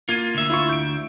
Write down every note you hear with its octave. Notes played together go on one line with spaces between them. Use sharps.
A#3 F4 G#6 D#7
D2 E5
E4 F4 C#6
G6 D7